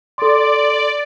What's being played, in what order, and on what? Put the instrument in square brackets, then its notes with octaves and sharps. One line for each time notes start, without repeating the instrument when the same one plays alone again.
[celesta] A4 C6 [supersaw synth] D5